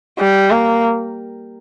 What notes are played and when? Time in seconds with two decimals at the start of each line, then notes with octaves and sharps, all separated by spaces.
0.19 G3
0.51 A#3